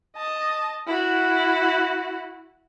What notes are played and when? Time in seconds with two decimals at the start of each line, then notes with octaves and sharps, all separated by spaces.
0.16 D#5 A5
0.87 E4 F#4